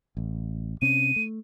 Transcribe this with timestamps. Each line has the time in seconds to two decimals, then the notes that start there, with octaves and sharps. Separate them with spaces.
0.17 A1
0.82 C3 C4 C#4 D#7
1.16 A3